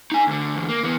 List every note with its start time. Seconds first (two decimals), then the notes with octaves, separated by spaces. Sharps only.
0.12 D#4 G#5
0.27 D2 D3
0.56 E2 D3
0.69 A#3
0.84 E3 B3